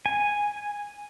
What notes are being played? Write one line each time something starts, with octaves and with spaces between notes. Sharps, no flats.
G#5